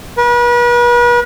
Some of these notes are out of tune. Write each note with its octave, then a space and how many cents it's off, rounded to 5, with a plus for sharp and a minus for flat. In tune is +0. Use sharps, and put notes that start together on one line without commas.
B4 -40